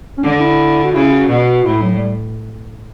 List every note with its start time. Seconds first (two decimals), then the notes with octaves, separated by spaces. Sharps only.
0.18 C#4
0.23 D3 D4
0.40 E4
0.84 F#4
0.94 C#3 E4
1.11 F#4
1.29 B2 F#4
1.65 A2 E4
1.82 F#3
1.96 G3